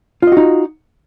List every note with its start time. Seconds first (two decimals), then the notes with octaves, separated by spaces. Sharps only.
0.22 F4
0.27 D#5
0.32 F#4
0.37 D#4